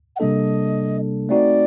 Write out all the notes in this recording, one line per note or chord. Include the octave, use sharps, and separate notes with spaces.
F#5
C3 G3 A#3 D4 A4 D#5
A3 C4 D#4 F#4 D5